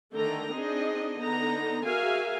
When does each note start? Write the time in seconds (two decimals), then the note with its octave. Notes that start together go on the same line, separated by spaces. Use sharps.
0.14 D3 D#3 A3 A4 G5 A#5
0.53 C4 D4 D#4 G#4 D#5
1.19 D3 B3 D#4 A#5
1.84 F#4 G#4 A#4 E5 F5 G#5